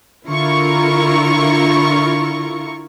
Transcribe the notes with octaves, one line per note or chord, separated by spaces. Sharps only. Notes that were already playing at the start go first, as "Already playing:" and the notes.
D3 E4 F4 A#4 C#6